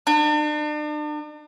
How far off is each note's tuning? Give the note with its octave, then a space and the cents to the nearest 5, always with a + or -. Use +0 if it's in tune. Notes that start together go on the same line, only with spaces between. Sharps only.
D4 +40